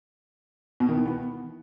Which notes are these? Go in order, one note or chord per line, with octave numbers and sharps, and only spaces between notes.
B2
D#3
E3
B3